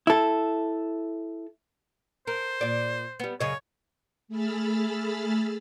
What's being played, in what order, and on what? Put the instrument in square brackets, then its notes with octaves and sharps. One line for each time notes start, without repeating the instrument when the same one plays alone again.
[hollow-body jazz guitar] E4 A4
[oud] A#4 [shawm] C5
[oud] A#2 D5
G3 B3
[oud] F#2 C#3 D#5 [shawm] C#5
[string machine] A3 G#4 B5 E6 F6 A6